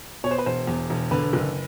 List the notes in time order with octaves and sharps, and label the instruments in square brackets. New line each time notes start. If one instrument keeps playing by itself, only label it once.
[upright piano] B2 C#5
C5
B4
E1 C5
E2
E1
D3 B4
F#1